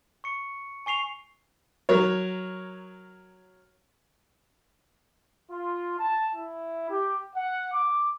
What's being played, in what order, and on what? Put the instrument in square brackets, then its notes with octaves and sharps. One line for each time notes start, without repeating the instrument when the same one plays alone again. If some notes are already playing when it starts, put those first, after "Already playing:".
[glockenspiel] C#6 C#7
G#5 C#6 C7 F7
[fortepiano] F#3 A#4 C#5
[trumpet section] F4
A5
E4
G4
F#5
D6